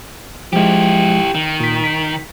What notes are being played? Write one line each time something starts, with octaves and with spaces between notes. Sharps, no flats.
F3 G#3 E4 G4
D#3
A#2 B6
B6